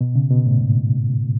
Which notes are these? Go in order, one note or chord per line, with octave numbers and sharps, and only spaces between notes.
B2
C#3
B2
A2
G#2